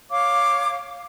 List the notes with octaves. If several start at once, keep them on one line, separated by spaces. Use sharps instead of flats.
C#5 F5 D6